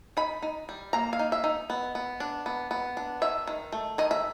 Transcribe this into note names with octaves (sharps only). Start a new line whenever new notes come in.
D#4 B5
D#4
G3
A#3 A#5
F5
D#4
E5
D#4
B3
B3
D4
B3
B3
D4
D#3 E5
D#3
A3
D#3 D#5
E5